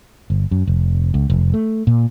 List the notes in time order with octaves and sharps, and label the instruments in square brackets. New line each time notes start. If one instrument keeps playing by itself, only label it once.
[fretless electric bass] G1
F#2
F1
C#2
F1
A3
A#2